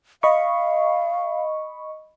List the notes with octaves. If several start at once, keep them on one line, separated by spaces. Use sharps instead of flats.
D#5 F5 B5 C#6